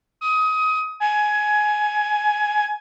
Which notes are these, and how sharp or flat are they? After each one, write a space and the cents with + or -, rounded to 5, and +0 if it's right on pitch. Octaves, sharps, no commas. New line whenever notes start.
D#6 +25
G#5 +15